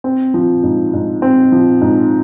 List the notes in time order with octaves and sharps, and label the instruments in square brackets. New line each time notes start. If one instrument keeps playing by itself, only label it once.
[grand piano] C4
F3
G#2
G#2
C4
F3
G#2